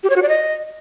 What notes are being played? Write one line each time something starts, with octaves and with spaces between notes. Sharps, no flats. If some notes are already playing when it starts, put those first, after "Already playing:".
G4
C#5
F#4
D5
D#5